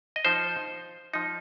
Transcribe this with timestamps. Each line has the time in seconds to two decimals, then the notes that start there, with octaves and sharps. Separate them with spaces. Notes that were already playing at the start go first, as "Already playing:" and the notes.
0.16 D#5
0.25 F3 D#4 C5
1.14 F3 D#4